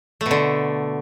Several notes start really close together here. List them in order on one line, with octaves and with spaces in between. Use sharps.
A3 B2 D3